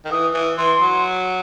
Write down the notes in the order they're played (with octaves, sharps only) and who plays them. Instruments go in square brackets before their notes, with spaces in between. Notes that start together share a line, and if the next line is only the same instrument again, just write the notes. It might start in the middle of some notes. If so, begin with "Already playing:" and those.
[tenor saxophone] D#3
[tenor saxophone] E3 [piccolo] D#6
[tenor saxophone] E3
[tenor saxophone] E3 [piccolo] C6
[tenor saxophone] F#3